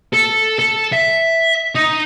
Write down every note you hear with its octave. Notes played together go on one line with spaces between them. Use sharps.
A4
A4
E5
D#4